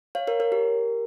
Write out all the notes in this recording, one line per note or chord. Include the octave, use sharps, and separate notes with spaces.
C#5 F5
A#4 C#5
A#4 C#5
G4 A#4